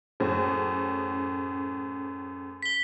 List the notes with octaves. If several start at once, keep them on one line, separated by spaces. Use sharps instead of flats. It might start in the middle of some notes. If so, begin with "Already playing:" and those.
F#2 A2 C#4 G#4 C5
B6 G7